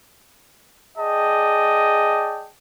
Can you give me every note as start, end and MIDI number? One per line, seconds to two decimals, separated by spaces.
0.98 2.48 68
0.98 2.48 74
0.98 2.48 75
0.98 2.48 79
0.98 2.48 81